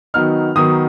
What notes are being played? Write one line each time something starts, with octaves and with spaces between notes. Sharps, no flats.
D#3 F#3 B3 D#4 F6
D#3 F#3 B3 D#4 D#6